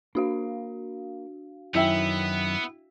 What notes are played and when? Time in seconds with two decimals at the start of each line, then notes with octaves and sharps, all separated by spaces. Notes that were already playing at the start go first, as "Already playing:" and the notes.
0.15 A#3 D4 F#4 F5
1.75 F#2 D#3 B3 C#4 E4 E5 G5